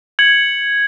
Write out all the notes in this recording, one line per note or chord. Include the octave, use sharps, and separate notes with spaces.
G#6 C#7 F#7